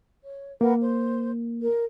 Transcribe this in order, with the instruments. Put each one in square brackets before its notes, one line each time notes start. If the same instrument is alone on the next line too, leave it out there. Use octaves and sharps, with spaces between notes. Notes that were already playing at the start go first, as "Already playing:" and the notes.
[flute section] C#5
[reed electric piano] A#3 [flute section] A#4 B4 F#5
[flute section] C5
A#4